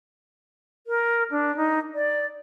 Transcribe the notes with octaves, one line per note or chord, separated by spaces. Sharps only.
A#4
D4
D#4
D5